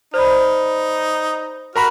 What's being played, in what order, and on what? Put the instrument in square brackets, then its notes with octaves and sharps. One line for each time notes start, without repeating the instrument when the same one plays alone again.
[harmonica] D#4 [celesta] C5 D5 B5
[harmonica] F#4 F6 [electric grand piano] A#4 A#5 B5